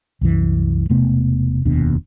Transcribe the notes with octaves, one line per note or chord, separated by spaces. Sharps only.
C2 F#2 E3
E1 C3 A3 B3
F1 D#2 B2 D4